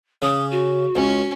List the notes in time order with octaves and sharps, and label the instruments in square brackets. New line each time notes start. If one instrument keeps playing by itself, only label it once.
[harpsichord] C#3 [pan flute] D#6
[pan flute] F#4
[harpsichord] C#2 [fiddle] C#4